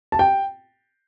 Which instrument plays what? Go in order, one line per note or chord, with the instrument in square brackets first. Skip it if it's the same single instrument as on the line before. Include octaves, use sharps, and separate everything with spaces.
[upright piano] A5
G5